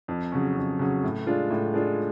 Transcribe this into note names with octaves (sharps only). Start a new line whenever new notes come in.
F2
C#3 F#3 C#4
F2
C#3 F#3 C#4
A2
G#3 D4 F4
A2
G#3 D4 F4